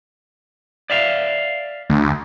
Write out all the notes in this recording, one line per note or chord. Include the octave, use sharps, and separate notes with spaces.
D5 E5 F5
D2